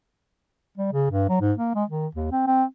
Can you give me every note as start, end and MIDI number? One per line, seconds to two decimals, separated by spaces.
0.78 0.90 55
0.93 1.07 49
1.11 1.29 43
1.29 1.37 54
1.41 1.53 44
1.58 1.73 58
1.75 1.84 56
1.90 2.07 51
2.15 2.28 39
2.32 2.43 60
2.47 2.64 60